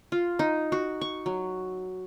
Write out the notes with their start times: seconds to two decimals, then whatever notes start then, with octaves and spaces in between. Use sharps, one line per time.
0.12 F4
0.39 D#4
0.72 F#4
1.01 C#6
1.26 F#3